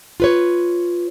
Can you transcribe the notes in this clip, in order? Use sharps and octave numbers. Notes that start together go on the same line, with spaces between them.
F4 B4 C#5